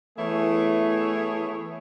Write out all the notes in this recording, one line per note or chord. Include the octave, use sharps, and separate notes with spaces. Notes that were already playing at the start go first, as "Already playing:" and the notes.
E3 A3 B3 E4 G#4 C#5